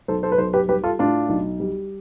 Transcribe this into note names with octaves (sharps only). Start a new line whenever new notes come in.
B1 A4 C5
A4 C5
B4
B1 A4 C5
G4 B4
G3 G4 B4
F4 A4
A2 D4 F4
B1
G3